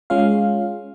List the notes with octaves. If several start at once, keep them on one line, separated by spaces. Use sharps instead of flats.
G#3 C#4 F4 F5